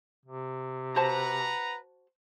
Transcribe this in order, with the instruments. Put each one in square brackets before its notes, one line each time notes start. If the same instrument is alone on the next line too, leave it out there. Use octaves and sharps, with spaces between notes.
[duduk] C3
[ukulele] F#4 C5 A5 [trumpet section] B4 F#5 A#5